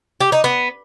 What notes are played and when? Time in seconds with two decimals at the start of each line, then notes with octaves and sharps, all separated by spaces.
0.21 G4
0.32 D#4
0.44 B3